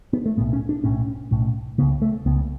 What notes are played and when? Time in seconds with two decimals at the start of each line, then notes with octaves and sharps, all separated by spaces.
0.13 B3
0.26 A3
0.37 B1 A2 B3
0.53 C#4
0.69 D4
0.84 B1 A2 C#4
1.31 B1 A2
1.78 C#3 B3
1.82 C#2
2.02 A3
2.26 C#2 C#3 B3